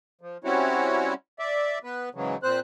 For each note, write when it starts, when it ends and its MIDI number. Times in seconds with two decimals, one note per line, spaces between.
0.21 0.37 53
0.44 1.14 55
0.44 1.14 60
0.44 1.14 61
0.44 1.14 64
0.44 1.14 66
0.44 1.14 73
1.39 1.79 74
1.39 1.79 76
1.84 2.09 59
1.84 2.09 71
2.15 2.37 44
2.15 2.37 49
2.15 2.37 52
2.15 2.37 54
2.43 2.60 46
2.43 2.60 60
2.43 2.60 72
2.43 2.60 90